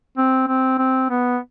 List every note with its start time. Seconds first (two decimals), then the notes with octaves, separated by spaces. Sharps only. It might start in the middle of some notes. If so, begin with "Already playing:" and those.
0.17 C4
0.48 C4
0.78 C4
1.10 B3